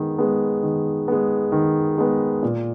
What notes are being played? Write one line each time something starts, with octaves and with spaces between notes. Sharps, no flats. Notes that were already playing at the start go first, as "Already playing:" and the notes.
Already playing: D#3 G#3 B3
G#3 B3
D#3
G#3 B3
D#3
G#3 B3
A#2